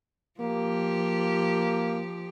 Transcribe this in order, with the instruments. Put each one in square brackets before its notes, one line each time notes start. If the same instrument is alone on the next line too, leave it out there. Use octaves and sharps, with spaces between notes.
[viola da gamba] F3 G4 [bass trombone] A#3